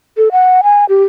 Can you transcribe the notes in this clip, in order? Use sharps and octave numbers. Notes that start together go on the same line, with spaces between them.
A4
F#5
G#5
G4